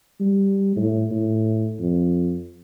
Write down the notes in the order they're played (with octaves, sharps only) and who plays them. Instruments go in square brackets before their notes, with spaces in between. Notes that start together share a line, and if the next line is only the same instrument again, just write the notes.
[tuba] G3
A2
A2
F2